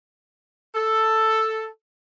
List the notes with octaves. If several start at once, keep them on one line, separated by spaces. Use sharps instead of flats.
A4